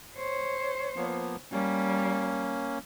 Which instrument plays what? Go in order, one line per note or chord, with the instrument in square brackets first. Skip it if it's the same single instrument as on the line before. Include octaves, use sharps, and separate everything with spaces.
[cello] C5 C#5
[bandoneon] F3 A#3 B3
[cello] G3 [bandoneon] A#3 C#4